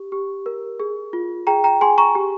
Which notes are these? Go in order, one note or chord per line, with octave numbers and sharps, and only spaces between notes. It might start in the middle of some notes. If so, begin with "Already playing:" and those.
Already playing: G4
G4
A#4
G#4
F4
G#4 G5 A#5
G5 A#5
G#4 G#5 C6
A#5 C#6
G4